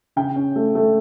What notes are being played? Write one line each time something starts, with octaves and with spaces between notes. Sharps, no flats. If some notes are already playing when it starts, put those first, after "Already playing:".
C#3 G5
C#4
A3
A3